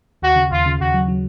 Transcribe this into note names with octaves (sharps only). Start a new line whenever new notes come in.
D#2 F#4
C#3
D#2 F4
C#3
D#2 F#4
F#3
F#3